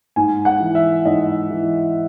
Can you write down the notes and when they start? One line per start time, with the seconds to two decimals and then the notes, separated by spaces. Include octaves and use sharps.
0.16 G#2 G#5
0.45 F#5
0.60 E3
0.75 E5
1.05 G#2 D#5
1.50 E3